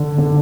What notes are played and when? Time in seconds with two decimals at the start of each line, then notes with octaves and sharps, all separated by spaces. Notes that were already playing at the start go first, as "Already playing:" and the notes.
Already playing: D3
0.18 D3